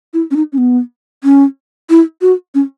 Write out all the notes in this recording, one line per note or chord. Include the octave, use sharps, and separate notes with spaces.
E4
C#4
D#4
C#4
B3
C#4
E4
F#4
C#4